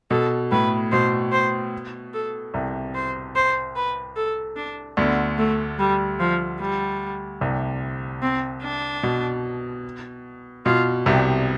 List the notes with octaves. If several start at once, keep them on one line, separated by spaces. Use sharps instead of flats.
B2 A4
A2 B4
B2 C5
C5
A4
C2 C3
C5
C5
B4
A4
D4
D2 D3 B3
A3
G3
F3
G3
C2 C3
C4
D4
B2
B2 F4
C2 C3 G4